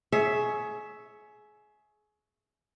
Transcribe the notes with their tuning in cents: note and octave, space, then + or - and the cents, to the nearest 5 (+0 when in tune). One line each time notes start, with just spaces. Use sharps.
G#4 +25 C#5 +0 E5 +0